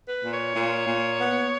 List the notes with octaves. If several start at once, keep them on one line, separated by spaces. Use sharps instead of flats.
B4
A#2
C#5
A#2
A#2
B3